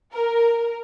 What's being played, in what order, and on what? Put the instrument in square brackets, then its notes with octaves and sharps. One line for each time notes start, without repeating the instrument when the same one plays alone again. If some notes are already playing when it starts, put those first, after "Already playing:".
[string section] A#4